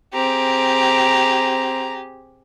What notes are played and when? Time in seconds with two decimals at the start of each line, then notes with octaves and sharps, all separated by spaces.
0.14 C4 G4 G#4 A#5